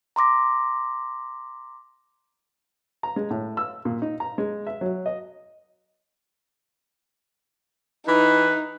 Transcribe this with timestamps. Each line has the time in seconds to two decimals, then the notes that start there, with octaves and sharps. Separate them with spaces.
0.16 A#5 C6 D6 A#6
3.03 A#5
3.16 G#3
3.30 A2
3.57 E6
3.85 A#2
4.02 D#4
4.20 A#5
4.38 G#3
4.67 E5
4.81 F#3
5.06 D#5
8.08 E3 D#4 B4